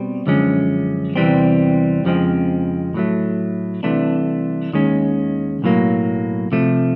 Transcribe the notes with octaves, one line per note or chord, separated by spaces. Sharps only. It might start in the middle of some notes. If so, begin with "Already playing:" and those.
Already playing: B2 G3 C4
F#2 D3 F3 G#3 C#4
E2 C3 E3 G3 C4
F2 C#3 F3 G#3 C4
A2 F#3 A3
C2 C3 E3 A3 D4
D#2 D#3 G#3 C#4
B1 A2 F#3 A#3
C3 F3 A3